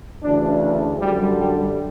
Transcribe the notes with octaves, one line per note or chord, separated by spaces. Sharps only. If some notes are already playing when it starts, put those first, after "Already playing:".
D2 C#3 E3 D4
D4
F#2 D3 G3
G3